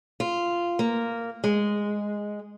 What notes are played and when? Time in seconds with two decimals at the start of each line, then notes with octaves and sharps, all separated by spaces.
0.20 F4
0.79 A#3
1.44 G#3